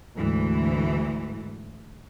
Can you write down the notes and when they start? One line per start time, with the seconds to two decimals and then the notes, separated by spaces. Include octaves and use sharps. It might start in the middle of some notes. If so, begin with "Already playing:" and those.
0.15 D2 G#2 E3